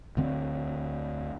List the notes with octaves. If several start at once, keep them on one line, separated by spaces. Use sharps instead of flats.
D2 D3 C4